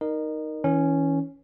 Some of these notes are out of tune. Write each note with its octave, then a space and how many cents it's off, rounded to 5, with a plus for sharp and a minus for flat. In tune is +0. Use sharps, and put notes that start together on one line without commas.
D#4 +0 A#4 +5 D#5 -30
E3 -35 C#4 +0